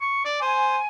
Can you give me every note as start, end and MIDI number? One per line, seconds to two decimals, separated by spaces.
0.01 0.21 85
0.25 0.39 74
0.41 0.78 72
0.41 0.86 80